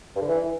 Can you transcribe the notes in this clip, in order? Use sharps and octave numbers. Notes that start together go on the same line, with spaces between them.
G2
D3
E3